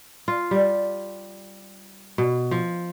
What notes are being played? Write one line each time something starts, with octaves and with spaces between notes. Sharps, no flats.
F4
G3
B2
F3